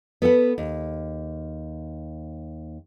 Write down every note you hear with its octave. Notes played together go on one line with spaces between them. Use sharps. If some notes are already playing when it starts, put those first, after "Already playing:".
B3 A4 B4 F#5
D#2